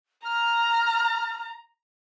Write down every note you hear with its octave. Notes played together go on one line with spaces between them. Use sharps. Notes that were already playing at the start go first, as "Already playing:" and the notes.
A#5 F6